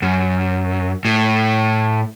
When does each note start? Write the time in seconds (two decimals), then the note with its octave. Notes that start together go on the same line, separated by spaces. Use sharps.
0.02 F#2
1.05 A2